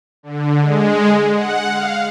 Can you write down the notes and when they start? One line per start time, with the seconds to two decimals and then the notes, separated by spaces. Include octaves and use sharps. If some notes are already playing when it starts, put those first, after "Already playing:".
0.23 D3
0.61 G#3
1.33 F#5
1.70 F5